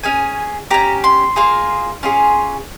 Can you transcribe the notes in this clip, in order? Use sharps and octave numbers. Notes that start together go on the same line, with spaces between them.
C#4 G#4 G#5
C#4 G4 A#5
C6
A#3 F4 G#4
C#4 F4 G#4